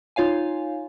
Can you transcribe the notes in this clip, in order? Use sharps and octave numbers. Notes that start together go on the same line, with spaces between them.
D#4 F4 C#5 F5 G#5